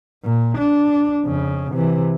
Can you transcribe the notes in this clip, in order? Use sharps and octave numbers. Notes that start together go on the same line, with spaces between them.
A#2
D4
F2 C#3
C3 E3